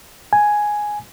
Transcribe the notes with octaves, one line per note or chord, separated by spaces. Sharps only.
G#5